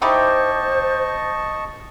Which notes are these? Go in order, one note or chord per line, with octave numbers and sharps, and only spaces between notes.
D#4 E4 G4 C5 D#5 A5 C#6